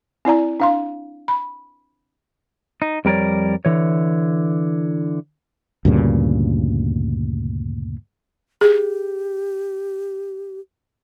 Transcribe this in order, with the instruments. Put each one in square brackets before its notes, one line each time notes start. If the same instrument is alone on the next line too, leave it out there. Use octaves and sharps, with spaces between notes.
[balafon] C4 E4 D5 A#5
D4 F5 C6
B5
[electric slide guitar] D#4
F2 G3 A#4 C#5 D5
D3 E3 C#5
[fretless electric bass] D2 G2 A#2 C#3
[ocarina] G4 [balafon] G#4